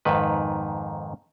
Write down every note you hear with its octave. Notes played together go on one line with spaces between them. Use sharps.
F2 G#2 D#3 B4